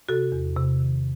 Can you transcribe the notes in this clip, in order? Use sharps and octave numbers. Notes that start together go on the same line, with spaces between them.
C3 F#4 A4
E2
C3
D#3